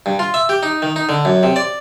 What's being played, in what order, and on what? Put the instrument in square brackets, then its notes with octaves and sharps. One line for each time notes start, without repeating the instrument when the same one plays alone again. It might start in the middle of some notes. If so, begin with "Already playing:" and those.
[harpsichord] G2
F4
E5
G4
D#4
D#3
D#4
D3
F#2
C3
D5